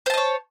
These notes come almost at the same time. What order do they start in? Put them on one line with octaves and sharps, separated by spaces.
C5 A5 D#5 C#5